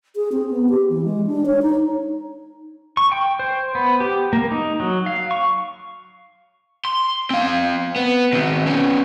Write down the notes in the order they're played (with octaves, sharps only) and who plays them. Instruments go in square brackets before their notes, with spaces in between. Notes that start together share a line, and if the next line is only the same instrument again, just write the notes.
[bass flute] G#4
C4
B3
G4
E3
G#3
D4
C#5
D#4
[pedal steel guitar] C#6
G5
C5
B3
G4
A#3
D#4
F#3
F5
C#6
[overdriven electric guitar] C6
C4 F5
B3
D#3 C4
B3 C#4